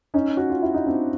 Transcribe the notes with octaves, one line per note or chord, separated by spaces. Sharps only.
C#4 D#4
F#4
F4
E4
D#4
C4 D4